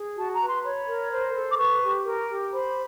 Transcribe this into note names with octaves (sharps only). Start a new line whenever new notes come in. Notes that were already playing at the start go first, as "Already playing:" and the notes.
Already playing: G#4
F#4 A5
A#5
B4
C6
C#5 B5
A#4
C5
A4
D6
B4 C#6
G4
A#4
G4
C5 B5